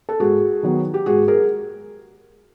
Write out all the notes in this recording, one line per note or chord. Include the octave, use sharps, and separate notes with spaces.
A4
G#2 F#4 G#4
D#3 F#3 B3
G4
G#2 F#4 G#4
G#4 A#4